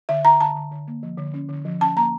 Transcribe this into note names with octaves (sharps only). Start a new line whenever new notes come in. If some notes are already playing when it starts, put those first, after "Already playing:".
D3 E5
D3 A#5
D3 A5
D3
D3
A#3
F3
D3
C#4
D3
F3
C#4 A5
A#3 A#5